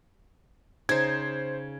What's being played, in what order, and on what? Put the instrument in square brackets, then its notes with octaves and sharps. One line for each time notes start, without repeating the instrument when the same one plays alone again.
[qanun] C#3 D#4 [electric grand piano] C5 G#6